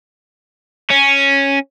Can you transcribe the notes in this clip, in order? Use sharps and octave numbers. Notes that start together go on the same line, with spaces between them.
C#4